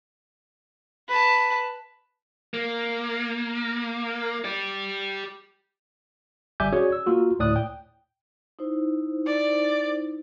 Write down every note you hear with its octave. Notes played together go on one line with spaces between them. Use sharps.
B4 A5
A#3
G4 D5
G1 G3 E5 G#5 D6 G6
C#4 F#4 G#4 C#5 D5
E6
A#3 F4 F#4
D2 A2 D5 D#6 F#6
G5
D#4 E4 C5
D5